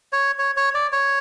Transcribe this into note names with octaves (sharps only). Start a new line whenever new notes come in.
C#5
C#5
C#5
D5
C#5